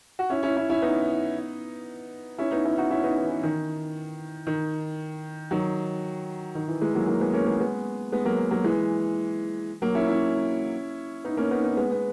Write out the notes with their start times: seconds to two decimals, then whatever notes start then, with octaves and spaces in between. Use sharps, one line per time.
0.19 F#4
0.30 C#4 E4
0.43 C#4 E4
0.56 C#4 E4
0.70 C#4 E4
0.82 B3 D#4
2.38 C#4 E4
2.51 B3 D#4
2.65 C#4 E4
2.78 D#4 F#4
2.90 C#4 E4
3.03 B3 D#4
3.17 E3
3.29 E3
3.43 D#3
4.47 D#3
5.51 D#3 F#3
6.55 D#3
6.68 E3
6.81 E3 G#3
6.94 F#3 A#3
7.07 F#3 A#3
7.21 G#3 B3
7.33 A#3 C#4
7.46 G#3 B3
7.60 G#3 B3
8.12 G#3 B3
8.25 F#3 A#3
8.51 F#3 A#3
8.64 E3 G#3
9.82 F#3 A#3
9.95 C#4 E4
10.08 C#4 E4
11.24 B3 D#4
11.37 A#3 C#4
11.51 B3 D#4
11.64 B3 D#4
11.77 G#3 B3
11.92 B3